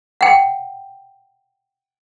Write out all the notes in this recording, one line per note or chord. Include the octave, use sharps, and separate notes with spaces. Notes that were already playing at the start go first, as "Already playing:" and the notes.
F#5 G5